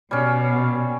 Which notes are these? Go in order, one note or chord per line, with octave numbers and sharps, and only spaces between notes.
B2 G3 C#4